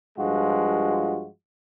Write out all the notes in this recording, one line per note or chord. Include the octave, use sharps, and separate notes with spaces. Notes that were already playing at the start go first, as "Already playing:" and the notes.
G2 F3 G#3 F4 F#4